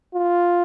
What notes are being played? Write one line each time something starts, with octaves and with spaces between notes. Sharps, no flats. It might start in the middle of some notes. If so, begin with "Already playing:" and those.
F4